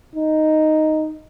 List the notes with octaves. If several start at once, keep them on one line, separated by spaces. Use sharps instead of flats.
D#4